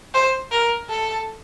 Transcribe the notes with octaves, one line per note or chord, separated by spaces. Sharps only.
C5
A#4
A4